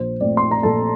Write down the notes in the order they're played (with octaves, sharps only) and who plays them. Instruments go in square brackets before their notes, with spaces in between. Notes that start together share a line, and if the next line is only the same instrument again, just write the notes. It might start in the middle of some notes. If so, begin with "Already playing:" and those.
Already playing: [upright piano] A#1 C5
A#2 A3 C4 D5
C6
A#5
A#1 A4 A5